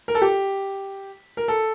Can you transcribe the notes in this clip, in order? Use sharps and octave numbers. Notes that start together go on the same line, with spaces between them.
A#4
A4
G4
A#4
A4